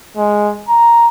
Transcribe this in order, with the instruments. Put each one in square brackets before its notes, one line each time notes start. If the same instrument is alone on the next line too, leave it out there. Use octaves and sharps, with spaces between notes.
[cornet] G#3
A#5